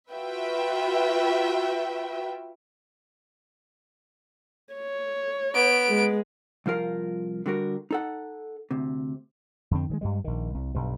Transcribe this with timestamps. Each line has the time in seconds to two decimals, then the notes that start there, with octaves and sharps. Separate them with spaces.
0.12 F4 F#4 B4 E5 G5
4.74 C#5
5.54 B3 D7
5.89 G#3
6.66 C2 F3 F4 A#4 F5
7.46 D3 G3 F#4 A#4
7.91 D#4 A4 F#5
8.71 D2 C3
9.71 F2 D3 C4
9.90 D#3 E3 G#3
10.01 G2 G3 G#3
10.24 A#1 D#3
10.54 C2
10.75 B1 G2